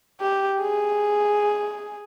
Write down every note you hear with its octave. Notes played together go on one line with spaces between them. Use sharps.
G4
G#4